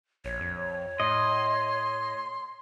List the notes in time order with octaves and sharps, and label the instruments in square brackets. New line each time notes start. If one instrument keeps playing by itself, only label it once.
[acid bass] A#1 [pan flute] C#5
[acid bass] F2
[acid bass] A2 [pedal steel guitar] D#5 [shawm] C6